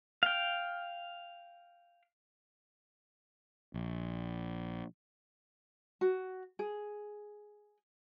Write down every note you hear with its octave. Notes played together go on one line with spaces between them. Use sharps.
F5 G5
A#1
F#4
G#4